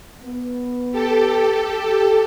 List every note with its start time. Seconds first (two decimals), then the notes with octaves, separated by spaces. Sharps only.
0.23 B3
0.92 G4 A4